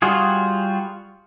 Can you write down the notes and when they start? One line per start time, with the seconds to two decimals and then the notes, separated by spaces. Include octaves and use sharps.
0.02 G3 F4 F#4 G#4